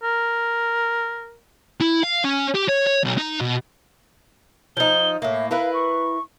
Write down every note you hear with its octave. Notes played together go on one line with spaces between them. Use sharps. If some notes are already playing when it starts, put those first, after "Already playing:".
A#4
E4
F5
C#4
G4
C#5
C#5
B1
D#4
B2
F3 D#4 G7
A2 A#3 E5
E4 A#4 B4 F5
C#6